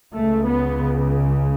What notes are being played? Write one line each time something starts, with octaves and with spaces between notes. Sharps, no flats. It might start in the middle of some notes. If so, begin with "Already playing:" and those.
C#2 C#3 A3
B3